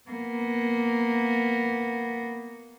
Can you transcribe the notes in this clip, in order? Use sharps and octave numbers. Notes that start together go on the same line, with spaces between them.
A#3 B3